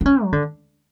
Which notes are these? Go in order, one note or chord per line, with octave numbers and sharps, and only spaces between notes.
D4
C#4
F#3
D3